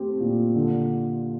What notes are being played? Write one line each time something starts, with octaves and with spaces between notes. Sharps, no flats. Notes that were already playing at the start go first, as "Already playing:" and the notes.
Already playing: A3 C4 G4
A#2
D3